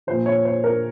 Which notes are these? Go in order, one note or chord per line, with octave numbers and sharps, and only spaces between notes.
A#2 F3 C5
C#5
C5
A#4